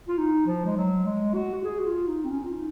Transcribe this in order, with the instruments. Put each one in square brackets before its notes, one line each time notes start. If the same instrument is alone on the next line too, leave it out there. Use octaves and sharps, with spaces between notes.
[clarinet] F4
D#4
F3
G#3
F#3
G#3
F#4
F#4
G#4
F#4
F4
D#4
C4
C#4
F4
D#4